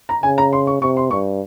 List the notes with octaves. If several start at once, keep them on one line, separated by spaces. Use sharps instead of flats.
A#5
C#3 G#5
A#5
C6
C#6
C3 C#6
C6
G2 C#6